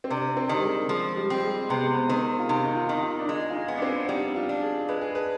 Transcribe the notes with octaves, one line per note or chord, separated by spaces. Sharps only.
C4
C3 D4
C4
D#3 G3
G#3
F3 G#3
G3
G3 C4
G#3
C3 B3
G#3
B3
D#3 C4
F4
C3 D#4
D#4
F4
D#3 D#4
F4
D4
G#3 D#4
F4
D#4
B3
D4
C4
G3 D#4
F4
D4
G#4
G#3 B4
G#4
B4